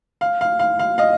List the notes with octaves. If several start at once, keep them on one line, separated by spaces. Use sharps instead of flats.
F5
F5
F5
F5
D#5 F5